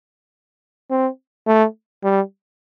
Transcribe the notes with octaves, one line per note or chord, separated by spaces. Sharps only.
C4
A3
G3